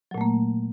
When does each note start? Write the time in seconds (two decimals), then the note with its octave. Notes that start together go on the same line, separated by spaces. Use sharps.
0.11 F#3
0.14 A#2
0.18 A3
0.21 A#3